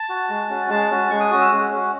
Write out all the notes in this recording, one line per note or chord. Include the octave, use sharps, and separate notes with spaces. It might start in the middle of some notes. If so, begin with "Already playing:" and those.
Already playing: A5
F#4
G#3
C#4 F#4
G#3 A5
C#4 F#4
G#3 C#6
D#6
C#4 F#4 D#6
E6
G#3
C#4 F#4